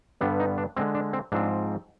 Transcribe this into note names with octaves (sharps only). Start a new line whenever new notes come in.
G2 D3 G3 B3 D4
D#4
D4
D3 G#3 C4
D4
C4
G#2 F3 C4 D4